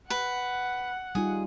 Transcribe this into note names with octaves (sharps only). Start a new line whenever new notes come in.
B4 F#5
G3 D#4 F4 G#4